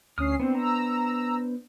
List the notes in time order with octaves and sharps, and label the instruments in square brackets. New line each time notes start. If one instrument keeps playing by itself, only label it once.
[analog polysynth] D2 C#4 C7 [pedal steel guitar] D#6 F6
[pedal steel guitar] B3 D4 C5 [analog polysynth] C4
[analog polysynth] A#5 E6